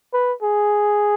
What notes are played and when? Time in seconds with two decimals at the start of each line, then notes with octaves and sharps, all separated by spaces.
0.13 B4
0.42 G#4